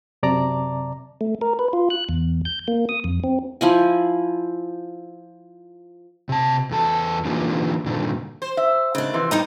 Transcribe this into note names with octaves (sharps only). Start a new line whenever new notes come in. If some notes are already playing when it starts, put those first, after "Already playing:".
F#2 C3 D5 A5 A#5 D6
A3
A#4
B4
F4
F#6
E2
G6
A#3
D#6
F2
C4
F3 E4 G#5
C3 A5
E2 A4 A5
D3 E3 A#3 D#4 F4 G4
G2 A#2 D3 D#3
C5
E5
D#2 C#3 D4
F2 C3 E3
A2 G3 D#4 D#5 A#5